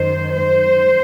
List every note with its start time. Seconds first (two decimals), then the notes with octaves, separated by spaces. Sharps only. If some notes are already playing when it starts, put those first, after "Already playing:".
Already playing: F#2 D#3 C5
0.34 C5